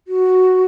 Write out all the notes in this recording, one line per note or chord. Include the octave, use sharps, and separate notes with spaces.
F#4